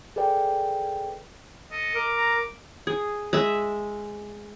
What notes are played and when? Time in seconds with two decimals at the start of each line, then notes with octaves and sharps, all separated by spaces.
0.16 G#4 A4 B4 D5 G5
1.72 A4 D#5
1.95 A#4 D6
2.16 A#5
2.87 G#4
3.33 G#3 E5